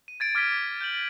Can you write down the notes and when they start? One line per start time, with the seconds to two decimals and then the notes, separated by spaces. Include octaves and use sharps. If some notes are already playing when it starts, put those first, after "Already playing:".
0.08 D#7
0.20 G#6 A6 D7 D#7
0.35 D6 F6 G#6 A6 B6 G7
0.81 G6 A6 F#7